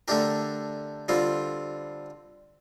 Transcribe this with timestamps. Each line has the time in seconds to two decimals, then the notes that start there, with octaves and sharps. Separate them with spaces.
0.08 D3 A3 D4 G4 A#4
1.08 D3 G3 C4 F4